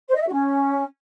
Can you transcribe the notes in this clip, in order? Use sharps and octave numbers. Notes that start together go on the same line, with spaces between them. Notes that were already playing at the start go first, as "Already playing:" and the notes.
C5
D#5
E5
F#4
C#4